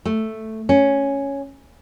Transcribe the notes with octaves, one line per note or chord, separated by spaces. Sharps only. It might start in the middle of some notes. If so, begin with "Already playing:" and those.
A3
C#4